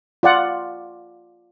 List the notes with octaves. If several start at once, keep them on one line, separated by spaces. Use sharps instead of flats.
F4 D5 F#5